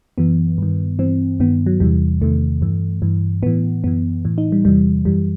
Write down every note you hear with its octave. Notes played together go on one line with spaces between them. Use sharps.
F#2 E3 B3
G2 D#3
G2 E3 C4
G2 D#3 B3
F#3
E2 C3 E3 G3
E2 C3 D#3 A3
G2 E3
G2 E3
A2 E3 B3
F#2 E3 B3
A2 E3
D#4
G3
E2 C3 E3 G3
F#2 E3 G3